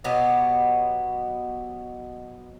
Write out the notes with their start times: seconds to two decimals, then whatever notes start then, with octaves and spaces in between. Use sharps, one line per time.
0.04 B2 F#3 B3 G4